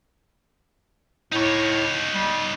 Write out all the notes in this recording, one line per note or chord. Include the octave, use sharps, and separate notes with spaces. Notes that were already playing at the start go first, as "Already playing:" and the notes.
A2 D#4 C#5
G3